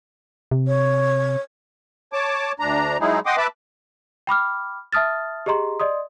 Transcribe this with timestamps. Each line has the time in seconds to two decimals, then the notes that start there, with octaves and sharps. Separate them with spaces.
0.51 C3
0.67 C#5
2.13 C#5 A5 D6
2.60 D2 D4 A#5
3.00 F#3 G#3 D#4 E4 G#4
3.26 D#5 F#5 G5 C6 D6 D#6
3.37 B4 E5 A5 B5 D6
4.27 G5 B5 D6 F6
4.93 E5 A5 D#6 F6 A6
5.46 G4 G#4 D#5 A#5 C6
5.79 D5 D#5 C6 D#6